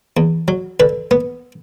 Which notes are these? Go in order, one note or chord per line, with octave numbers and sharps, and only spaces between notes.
E2
F#3
D3 B4
B3